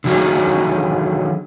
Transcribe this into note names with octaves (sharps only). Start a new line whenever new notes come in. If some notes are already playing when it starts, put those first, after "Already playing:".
D3 D#3 F#3 F#4 G#4